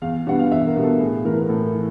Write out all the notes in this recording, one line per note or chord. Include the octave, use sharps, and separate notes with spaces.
E2 F5
B2 G3 B3 D4 F#5
F5
E2 E5
A#4
B2 G3 B3 D4
A4
A2 G#4
E3 A3 A#4
B4
A#4
A2 A4
E3